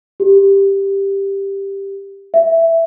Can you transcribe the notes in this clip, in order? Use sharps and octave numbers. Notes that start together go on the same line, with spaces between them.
G4
E5